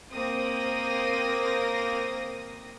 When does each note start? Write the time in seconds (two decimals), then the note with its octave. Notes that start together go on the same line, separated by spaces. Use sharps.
0.13 A#3 C4 D#6 A#6